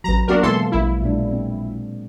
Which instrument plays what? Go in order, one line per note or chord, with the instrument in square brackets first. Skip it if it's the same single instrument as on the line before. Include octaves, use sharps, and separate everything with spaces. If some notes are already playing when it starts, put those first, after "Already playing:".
[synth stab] A1 A#5 [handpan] F#3 B4
[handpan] F#3 A#3 B3 [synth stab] D4 F#4 A#4
[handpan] B2 G#3 A#3 [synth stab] E3 A4 C6
[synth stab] A#1 E4
[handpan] A#2 G#3 D4
C4